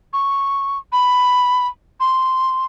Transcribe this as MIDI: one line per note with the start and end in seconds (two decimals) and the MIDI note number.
0.13 0.78 85
0.92 1.67 83
2.00 2.66 84